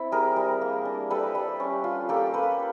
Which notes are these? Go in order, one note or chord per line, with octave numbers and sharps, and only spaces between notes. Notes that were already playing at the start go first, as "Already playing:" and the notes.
Already playing: C4 E4
G3 G#4 A#4
G3
A#3
D4
G3 A4 B4
G3
C#4
F4
A#3 G4 A4
A#3 A4 B4